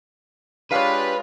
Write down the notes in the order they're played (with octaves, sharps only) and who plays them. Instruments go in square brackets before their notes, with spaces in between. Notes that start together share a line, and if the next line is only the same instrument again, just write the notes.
[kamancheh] G#3 F4 [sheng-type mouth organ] D4 G4 F#6 [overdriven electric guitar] B4 [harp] C#5 F5